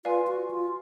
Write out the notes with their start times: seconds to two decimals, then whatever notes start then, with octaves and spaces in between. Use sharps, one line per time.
0.05 F4 B4 D5 F5 G#5
0.27 F#4
0.51 F4